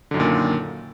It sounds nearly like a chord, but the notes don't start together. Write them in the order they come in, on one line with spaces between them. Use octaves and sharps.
D3 F#2 D#3 A#2